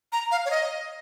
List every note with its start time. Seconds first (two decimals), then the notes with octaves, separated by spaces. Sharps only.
0.12 A#5
0.31 F5
0.45 C#5
0.51 D#5